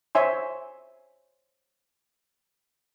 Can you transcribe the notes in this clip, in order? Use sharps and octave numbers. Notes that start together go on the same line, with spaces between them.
C5 C#5 E5 G#5 C6